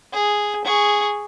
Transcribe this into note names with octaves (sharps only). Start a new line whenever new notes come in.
G#4
G#4 C#6